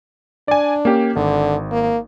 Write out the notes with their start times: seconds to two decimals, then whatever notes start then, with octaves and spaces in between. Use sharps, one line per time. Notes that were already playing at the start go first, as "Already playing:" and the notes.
0.48 D4 D5 G#5
0.85 A#3 C#4 G4
1.16 G#1 D3
1.71 A#3